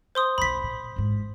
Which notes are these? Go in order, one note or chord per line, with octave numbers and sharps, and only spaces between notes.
C5 C6 D#6
B1 G2 B5 B6
A#2
A1 G#2